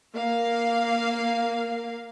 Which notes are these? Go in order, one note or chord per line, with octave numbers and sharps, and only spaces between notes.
A#3 F5